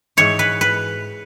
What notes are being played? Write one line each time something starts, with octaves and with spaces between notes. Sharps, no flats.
G#2 E3 C#5
B4
B4